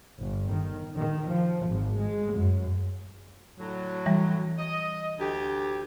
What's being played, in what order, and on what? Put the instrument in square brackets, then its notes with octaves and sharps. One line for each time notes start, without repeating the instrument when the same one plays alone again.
[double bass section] G1
D#3
D#3
F3
G#1
G#3
F#2
[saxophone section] A2 D3 F#3
[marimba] E3 G3
[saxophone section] D#5
D2 G4